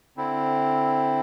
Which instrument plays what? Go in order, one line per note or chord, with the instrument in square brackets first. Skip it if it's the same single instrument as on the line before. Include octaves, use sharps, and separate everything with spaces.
[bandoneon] D3 C4 E4